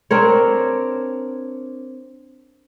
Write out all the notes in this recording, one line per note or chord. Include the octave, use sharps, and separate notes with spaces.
C4 D4 A#4 C#5